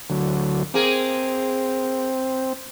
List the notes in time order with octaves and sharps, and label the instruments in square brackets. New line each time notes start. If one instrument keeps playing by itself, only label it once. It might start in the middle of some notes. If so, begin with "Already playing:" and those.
[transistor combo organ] D2 D3 F#3
[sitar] A#3 G#4 [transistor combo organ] C4